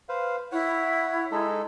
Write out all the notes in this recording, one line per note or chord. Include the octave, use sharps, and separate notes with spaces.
B4 C5 F5
E4 C#5 F#5
G#3 D#4 A4